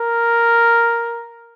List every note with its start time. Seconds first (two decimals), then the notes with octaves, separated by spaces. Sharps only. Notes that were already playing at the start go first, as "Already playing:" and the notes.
Already playing: A#4